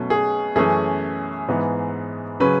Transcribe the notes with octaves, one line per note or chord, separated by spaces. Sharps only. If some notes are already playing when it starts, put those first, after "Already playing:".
Already playing: B2 F#3 A3 C#4
G#4
F#2 E3 A3 C#4 G#4
G#2 E3 B3
C#3 F#3 C#4 B4